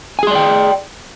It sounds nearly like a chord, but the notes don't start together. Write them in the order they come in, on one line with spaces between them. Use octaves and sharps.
G#5 G#4 C6 D5 G5